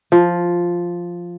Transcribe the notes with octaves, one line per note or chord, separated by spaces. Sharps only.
F3